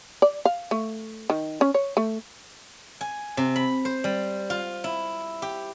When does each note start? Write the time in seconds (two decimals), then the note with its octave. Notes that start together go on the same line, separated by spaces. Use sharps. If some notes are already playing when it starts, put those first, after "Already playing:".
0.22 D5
0.45 F5
0.71 A3
1.30 D#3
1.61 C#4
1.74 C#5
1.97 A3
3.01 G#5
3.37 C3
3.56 B5
3.85 C5
4.04 G3
4.50 F4
4.84 E4
5.42 G4